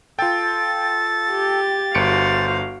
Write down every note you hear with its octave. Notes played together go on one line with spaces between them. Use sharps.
F4 A4 G5 A6
G4
G1 F#4 C5 F5 C#7 D7